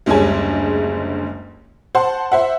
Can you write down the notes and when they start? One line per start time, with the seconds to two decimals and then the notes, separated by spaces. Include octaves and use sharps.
0.06 F#1 D2 G3 G#3 C#5 G#5
1.95 C5 F#5 A5 C6
2.32 C5 E5 F#5